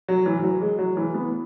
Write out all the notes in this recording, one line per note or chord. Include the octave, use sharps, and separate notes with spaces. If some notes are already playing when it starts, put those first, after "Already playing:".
F#3
E3
E3
F#3
G#3
F#3
E3
B3